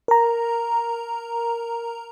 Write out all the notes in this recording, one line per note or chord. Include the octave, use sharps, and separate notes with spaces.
A#4 A#5